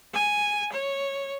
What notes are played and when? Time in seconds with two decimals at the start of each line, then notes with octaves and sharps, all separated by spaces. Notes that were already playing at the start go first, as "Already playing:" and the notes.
0.14 G#5
0.72 C#5